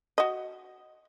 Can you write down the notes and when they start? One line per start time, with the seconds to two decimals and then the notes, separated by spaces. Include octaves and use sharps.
0.18 F#4 D#5